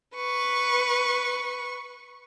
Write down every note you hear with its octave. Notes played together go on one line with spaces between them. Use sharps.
B4 C#6